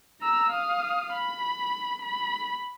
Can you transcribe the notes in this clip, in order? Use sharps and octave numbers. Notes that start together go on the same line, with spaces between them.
A#5 E6
F5 D#6
B5
B5